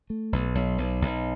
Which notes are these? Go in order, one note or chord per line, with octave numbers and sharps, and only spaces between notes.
A3
B1
B1
B1
B1